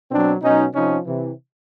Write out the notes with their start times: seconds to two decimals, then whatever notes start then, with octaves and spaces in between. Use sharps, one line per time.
0.11 B2 F#3 C4 D4
0.42 B2 F#3 C#4 D#4
0.74 C3 F3 C#4 D#4
1.06 C3 E3